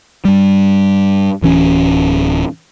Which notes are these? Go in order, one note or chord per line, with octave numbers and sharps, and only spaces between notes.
G2 G3
D1 E3 C#4